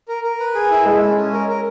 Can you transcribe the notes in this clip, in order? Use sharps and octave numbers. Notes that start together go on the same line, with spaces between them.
A#4
A#4
B4
G#4
E4
G#3 A4
C#4
C#4
A#4
A#4